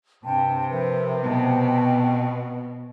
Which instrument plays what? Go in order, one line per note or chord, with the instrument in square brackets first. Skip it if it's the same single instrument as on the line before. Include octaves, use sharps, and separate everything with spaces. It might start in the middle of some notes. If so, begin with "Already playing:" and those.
[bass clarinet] G2 [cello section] C3 [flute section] G5 A5
[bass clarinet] F3 [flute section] A#4 B4 E5
[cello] B2 [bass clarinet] B3 [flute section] G5 A5